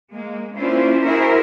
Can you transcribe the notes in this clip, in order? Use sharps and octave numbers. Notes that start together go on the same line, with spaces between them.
G#3 A#3
A#3 C#4 D4 E4 F4 C5
E4 F#4 G#4 A#4 C5 E5